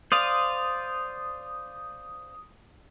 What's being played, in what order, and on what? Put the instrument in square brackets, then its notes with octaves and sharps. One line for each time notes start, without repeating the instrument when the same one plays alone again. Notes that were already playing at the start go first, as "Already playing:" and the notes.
[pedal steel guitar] C5 D5 F5 [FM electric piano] D#6